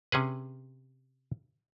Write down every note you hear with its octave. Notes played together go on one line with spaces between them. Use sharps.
C3 C#4 G#4 B4